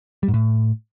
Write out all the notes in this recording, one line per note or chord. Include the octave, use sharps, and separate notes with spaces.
G3
G#2
A2